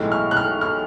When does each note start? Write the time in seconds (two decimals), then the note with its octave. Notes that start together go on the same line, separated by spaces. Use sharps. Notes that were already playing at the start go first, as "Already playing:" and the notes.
Already playing: B1 A2 E3 G#3
0.12 F6
0.31 F#6
0.37 F6
0.61 F6